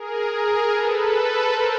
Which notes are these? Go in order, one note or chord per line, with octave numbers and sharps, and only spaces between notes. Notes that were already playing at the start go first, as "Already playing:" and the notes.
Already playing: G#4 A#4
G#4 A#4
A4 B4
A#4 C5